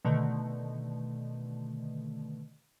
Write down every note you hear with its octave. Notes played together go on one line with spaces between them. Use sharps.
B2 D3 D#3 A3